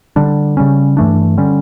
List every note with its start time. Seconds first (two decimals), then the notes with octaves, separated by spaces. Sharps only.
0.16 D3 G3 D4
0.57 C#3 G3 C#4
0.97 G2 E3 A3 D4
1.37 D3 G3 C#4